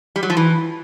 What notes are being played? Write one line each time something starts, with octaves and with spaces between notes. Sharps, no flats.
G3
F#3
F3
E3